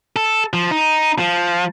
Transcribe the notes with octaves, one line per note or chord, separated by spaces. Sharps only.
A4
F3
D#4
F3